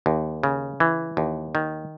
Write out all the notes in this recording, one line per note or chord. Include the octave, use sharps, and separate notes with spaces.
D#2
C#3
E3
D#2
D#3